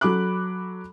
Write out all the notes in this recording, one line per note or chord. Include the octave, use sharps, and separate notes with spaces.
F#3 A4 B5 D6 F#6